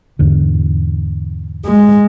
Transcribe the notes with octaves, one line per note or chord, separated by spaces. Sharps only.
E2 G#2 D3
G#3